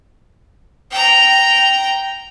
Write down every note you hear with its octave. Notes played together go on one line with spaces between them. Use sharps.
G5 A#5